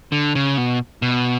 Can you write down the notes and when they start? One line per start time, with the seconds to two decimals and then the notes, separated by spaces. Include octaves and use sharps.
0.12 D3
0.35 C#3
0.58 B2
1.02 B2